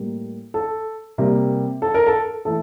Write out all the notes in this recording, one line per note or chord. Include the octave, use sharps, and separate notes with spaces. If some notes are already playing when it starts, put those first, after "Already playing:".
Already playing: A2 G3 A#3
A4
C3 G3 A#3
A4
A#4
A4
E3 A3 A4